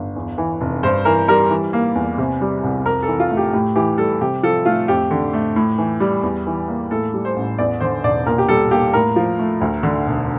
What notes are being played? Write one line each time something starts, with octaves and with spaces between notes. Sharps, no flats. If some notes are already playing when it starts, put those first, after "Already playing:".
Already playing: G1
E2
E3
F1
G2 C5
E3 A#4
G3 A#4
E3
A#3
E2
C3
G3
C2
F2 A#4
A4
E3
F4
A3
G4
A2 G4
E3 G4
G3 A4
C3 G4
F3 A4
A3 F4
F2 G4
D3
A3
A2
E3
G3
E2
E3
A#3
A2 A4
G3
C5
A1
E2 D5
D3 C5
E1 D5
A#2 A#4
G4
G3 A4
A#3 G4
A2 A#4
F3
A3
D2
D3
E1